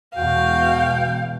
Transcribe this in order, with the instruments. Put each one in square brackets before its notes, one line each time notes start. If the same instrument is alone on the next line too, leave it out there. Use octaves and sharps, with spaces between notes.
[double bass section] E2 B2 G#3 [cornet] F#4 [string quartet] F5 [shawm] G5